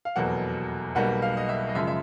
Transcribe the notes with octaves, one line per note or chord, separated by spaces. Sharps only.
F5
F1 E2 B2 F#3 A#3 F#5
B1 B2 G3 A#3 F#5
F5
D#5
E5
D#5
F#2 C#3 F3 G#3 E5
E5